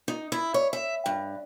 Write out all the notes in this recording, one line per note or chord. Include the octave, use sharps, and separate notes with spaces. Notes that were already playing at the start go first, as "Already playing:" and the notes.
D#4
E4
C#5
E5
G2